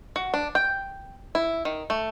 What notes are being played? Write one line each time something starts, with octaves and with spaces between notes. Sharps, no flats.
F#4
D4
G5
E4
D#3
A3